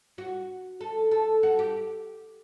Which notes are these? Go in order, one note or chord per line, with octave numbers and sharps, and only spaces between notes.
F#4
A4
A4
F#4
G4